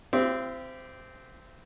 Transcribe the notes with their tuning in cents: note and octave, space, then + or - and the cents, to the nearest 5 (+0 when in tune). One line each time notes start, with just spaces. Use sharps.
C4 -15 E4 +45 G4 +0